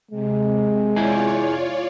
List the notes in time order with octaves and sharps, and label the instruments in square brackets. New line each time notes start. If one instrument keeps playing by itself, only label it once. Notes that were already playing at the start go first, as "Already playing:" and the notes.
[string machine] C3 [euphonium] G#3
[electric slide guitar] E4 G#4 [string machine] F4 C#5 D5